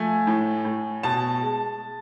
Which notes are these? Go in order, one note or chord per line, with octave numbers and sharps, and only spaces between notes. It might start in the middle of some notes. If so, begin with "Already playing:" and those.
Already playing: F3 A3 G#5
A2
A2
B2 A5
G#3